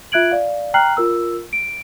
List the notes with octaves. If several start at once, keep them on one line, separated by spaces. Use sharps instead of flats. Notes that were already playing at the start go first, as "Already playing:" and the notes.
F4 E5 F#6 G#6 D7 F#7
D5 F5
G5 A#5 F6 F#6 C7 F#7
F4 A#4 E6
D7